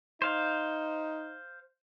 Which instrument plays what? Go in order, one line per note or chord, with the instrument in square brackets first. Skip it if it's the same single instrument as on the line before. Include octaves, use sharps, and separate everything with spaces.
[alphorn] D#4 [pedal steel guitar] C5 F5